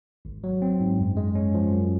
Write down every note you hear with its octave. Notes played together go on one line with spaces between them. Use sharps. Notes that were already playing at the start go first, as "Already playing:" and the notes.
G#1
F#3
C4
G#2
F#2
G#3
C#4
F3
F#2